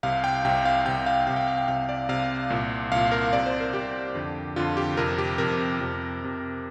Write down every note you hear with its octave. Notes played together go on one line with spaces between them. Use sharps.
C2 C3 F5
G5
C2 C3 G5
F5
C2 C3 G5
F5
C2 C3 F5
G5
F5
G5
C2 C3 F5
D5
C2 C3 F5
C2 A#2
C2 A#2 F5
A#4
C2 C3 D5
C5
A#4
C2 C3 G4
F2 D3
F2 D3 F4
G4
F2 C3 A#4
G4
F2 C3 A#4
F2 C3
F2 C3